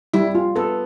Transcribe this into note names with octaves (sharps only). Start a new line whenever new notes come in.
G3 E4
F4
B3 A4